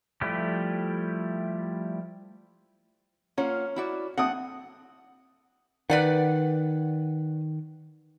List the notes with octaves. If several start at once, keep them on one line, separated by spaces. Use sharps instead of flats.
F3 G3 A3 E4 G4
A#3 C#4 F4 F#5
E4 F#4 D5
C4 D4 F#5 D#6
D#3 B4 D5 F#5